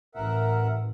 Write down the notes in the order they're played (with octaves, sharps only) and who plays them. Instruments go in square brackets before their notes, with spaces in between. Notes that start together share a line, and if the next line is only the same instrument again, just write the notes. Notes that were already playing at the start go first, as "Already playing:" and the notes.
[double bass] A1 [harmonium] A#4 E5 F#5